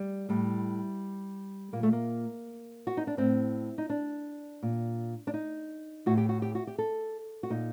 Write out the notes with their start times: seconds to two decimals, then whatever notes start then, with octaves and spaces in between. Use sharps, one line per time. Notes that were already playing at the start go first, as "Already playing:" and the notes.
Already playing: G3
0.29 A2 G3
1.73 A#2 A#3
1.83 A3
1.92 A#3
2.87 F#4
2.97 D#4
3.07 D4
3.17 A2 C4
3.78 D#4
3.89 D4
4.63 A#2
5.27 D4
5.34 D#4
6.06 A2 F#4
6.17 G4
6.29 F#4
6.42 G4
6.55 F#4
6.67 G4
6.78 A4
7.43 F#4
7.50 A#2 D#4